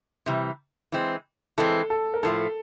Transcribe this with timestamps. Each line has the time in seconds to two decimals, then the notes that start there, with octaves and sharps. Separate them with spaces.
0.26 C3 E3 G3
0.92 E3 G#3 C4
1.58 E3 G#3 C4 A4
1.90 A4
2.14 A#4
2.23 A2 F3 A3 A4